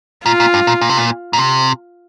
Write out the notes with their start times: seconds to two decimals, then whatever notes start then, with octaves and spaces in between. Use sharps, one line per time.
0.25 A#2 F4
0.40 A#2
0.54 G2
0.67 A#2
0.81 A#2
0.89 C3
0.97 A#2
1.33 A#2
1.38 C3